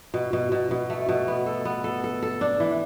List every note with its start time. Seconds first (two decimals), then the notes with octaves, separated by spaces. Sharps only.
0.14 B2
0.33 B2
0.52 B2
0.71 B2
0.90 A3
1.09 B2
1.28 B3
1.46 A4
1.65 B3
1.84 A4
2.04 A4
2.23 A4
2.41 D4
2.60 E3